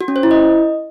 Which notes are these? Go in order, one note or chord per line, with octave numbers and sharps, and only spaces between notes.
F#4
C#4
C5
E4
D#5